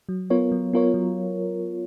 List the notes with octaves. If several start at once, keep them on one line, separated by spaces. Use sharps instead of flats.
F#3
B3 F4 A#4 C#5
F#3
B3 F4 A#4 C#5
F#3